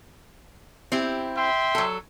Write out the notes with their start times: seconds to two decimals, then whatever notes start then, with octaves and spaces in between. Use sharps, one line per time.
0.92 C4 E4 G4
1.36 E5 G5 C6
1.75 F#3 A4